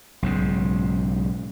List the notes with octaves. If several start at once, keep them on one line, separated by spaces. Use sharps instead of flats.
B1 G#2 C#3